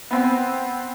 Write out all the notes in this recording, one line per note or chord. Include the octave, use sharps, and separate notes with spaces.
B3 C4